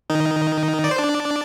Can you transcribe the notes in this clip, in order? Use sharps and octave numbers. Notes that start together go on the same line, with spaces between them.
D#3 D#4
D5
C5
D4 D5